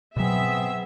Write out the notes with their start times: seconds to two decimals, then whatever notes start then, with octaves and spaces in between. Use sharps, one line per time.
0.17 B2 F#3 B3 C4 G#4 E5